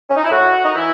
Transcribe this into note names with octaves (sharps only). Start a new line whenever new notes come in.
C#4
D#4
E4
A2 F#4
D#4
E3 E4